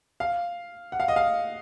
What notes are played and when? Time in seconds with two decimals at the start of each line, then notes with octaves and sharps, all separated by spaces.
0.20 F5
0.92 F#5
1.00 F5
1.08 D#5
1.16 F5